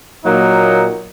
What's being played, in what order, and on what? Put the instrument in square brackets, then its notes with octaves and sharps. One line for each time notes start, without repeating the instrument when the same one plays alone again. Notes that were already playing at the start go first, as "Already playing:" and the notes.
[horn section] A#2 F#3 A#3 D#4